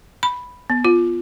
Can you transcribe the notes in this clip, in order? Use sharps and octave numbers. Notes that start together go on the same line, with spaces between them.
B5
B3
F4